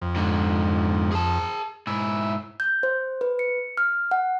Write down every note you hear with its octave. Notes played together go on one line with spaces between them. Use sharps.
F2
G#2 D3
G#4 A5
G#2 E4 E5
G6
C5
B4
C#7
F6
F#5